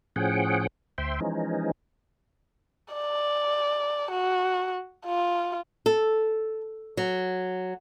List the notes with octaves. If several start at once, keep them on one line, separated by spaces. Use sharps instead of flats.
A2 F3 C#4 G#4 F#5 G5
D2 C5 E5 G5 C6
E3 F3 G#3 C#4 D#4
D5
F#4
F4
A4
F#3